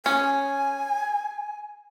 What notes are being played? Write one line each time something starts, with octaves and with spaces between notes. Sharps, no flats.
C#4 G#5